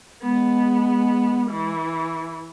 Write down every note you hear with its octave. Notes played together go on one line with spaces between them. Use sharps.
G#3 B3
E3